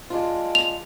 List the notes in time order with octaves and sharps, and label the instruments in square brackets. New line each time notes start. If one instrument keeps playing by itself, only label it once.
[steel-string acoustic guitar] G#3 D4 F4
[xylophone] F7